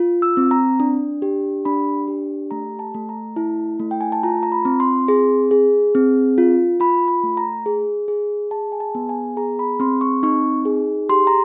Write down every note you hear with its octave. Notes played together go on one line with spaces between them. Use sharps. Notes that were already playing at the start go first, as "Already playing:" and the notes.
Already playing: F4
E6
C4
A#5
D4
G4
D4 B5
G4
A3 A#5
A5
A3
A#5
E4 A5
A3
G5
G#5
A5
F4 A#5
A#5
B5
C4
C6
G#4
G#4
C4
F4
F4 B5
B5
A3
A#5
G#4
G#4
G#4 A5
G#5
A5
B3
G#5
G#4 A#5
B5
C4 C6
C#6
D#4 C#6
G#4
G4 C6
A#5